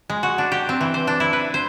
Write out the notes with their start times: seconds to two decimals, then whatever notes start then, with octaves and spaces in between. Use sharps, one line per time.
0.10 G#3
0.23 F#4
0.38 D4
0.52 G4
0.69 C4
0.81 E3
0.94 C5
1.07 D4
1.20 E4
1.33 B4
1.54 C5